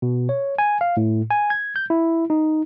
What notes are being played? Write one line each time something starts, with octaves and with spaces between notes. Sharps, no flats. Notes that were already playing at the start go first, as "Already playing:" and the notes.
B2
C#5
G#5
F5
A2
G#5
G#6
G6
E4
D#4